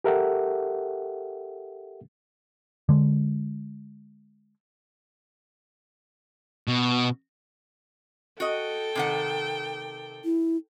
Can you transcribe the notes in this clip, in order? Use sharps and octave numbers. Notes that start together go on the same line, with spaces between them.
G4 A4 A#4 E5 F#5 G5
D3 G#3
B2
F#4 A4 D#5 G5
C3 D#3 F#5
E4